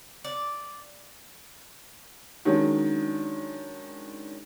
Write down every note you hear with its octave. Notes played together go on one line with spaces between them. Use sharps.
D5
D#3 F#3 G#3 C#4 D4